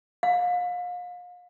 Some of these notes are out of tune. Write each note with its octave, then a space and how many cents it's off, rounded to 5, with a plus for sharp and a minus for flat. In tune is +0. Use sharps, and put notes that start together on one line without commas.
F5 +35